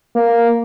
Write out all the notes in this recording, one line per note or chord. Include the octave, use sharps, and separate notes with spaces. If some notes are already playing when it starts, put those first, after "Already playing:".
A#3